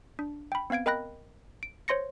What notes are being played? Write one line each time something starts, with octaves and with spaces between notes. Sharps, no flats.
D4
G5 B5
B3 C4 F5 G#6 D7
A#4 D#5 G5 B5 F#6 A#6
D7
C5 C#5 C6 A#6 C#7